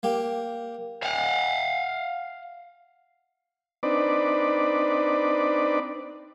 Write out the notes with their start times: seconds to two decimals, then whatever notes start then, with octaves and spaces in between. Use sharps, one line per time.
0.03 A#3 G4
1.03 F5 F#5
3.83 C4 D4 D#4 B4 D5